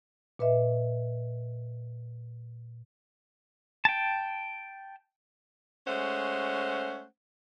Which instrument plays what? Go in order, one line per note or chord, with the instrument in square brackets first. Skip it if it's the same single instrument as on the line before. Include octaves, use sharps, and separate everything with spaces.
[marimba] A#2 B4 D#5 E5
[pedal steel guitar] G5 A5
[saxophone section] G#3 A3 C#4 C5 F#5